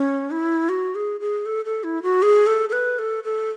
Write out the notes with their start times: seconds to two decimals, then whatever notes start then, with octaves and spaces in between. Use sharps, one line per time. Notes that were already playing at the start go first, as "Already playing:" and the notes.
Already playing: C#4
0.31 E4
0.69 F#4
0.95 G#4
1.20 G#4
1.46 A4
1.65 A4
1.84 E4
2.03 F#4
2.22 G#4
2.47 A4
2.69 A4
2.72 B4
2.99 A4
3.24 A4